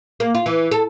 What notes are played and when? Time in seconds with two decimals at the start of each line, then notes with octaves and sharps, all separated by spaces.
0.20 A#3
0.35 F4
0.46 E3
0.71 A4